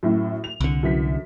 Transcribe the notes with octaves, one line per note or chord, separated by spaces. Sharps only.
F#2 A2 F#3
F7
C2 D3
F#2 E3 B6